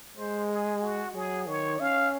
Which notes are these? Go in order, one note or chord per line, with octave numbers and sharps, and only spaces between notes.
G#3 C5
G#4
F#4
F#3 G#4
D#3 C#5
C#4 F5